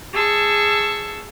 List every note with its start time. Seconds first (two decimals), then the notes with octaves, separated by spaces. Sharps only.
0.13 G#4 A5 C#6 E6